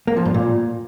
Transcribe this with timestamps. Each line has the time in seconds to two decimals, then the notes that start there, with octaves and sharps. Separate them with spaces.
0.07 A#3
0.16 F3
0.25 G2
0.34 A#2